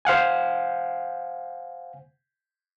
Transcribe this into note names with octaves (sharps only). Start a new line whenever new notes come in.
C5 F5 F#5 G#5